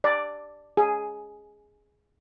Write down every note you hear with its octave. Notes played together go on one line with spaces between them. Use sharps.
D5
G#4